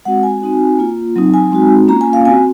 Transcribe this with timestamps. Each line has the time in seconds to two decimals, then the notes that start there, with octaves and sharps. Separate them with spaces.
0.05 G#3 C4 F#4 F#5
0.23 G#5
0.42 C4 D#4 F#4
0.79 A#3 F4
1.16 F#3 C4 D#4
1.34 G#5
1.52 G#3 C4 D#4 F#4
1.88 A#3 C#4 F4 A#5
2.01 G#5
2.13 F5
2.25 C4 F#4 G#5